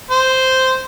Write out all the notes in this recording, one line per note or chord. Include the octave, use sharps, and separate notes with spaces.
C5